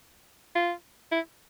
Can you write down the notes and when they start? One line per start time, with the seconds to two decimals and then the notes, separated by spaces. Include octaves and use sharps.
0.55 F4
1.12 E4